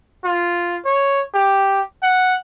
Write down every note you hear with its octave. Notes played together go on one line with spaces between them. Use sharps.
F4
C#5
G4
F#5